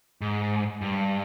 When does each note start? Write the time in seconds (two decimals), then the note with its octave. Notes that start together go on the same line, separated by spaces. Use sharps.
0.21 G#2
0.81 G2